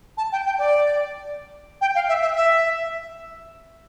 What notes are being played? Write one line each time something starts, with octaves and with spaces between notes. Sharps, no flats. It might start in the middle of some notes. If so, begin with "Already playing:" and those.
A5
G5
G5
D5
G5
F5
E5
E5
E5